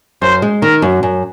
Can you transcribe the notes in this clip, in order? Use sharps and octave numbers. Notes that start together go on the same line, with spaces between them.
F#2 C5
G#3
D#3 A#4
F#2
F#2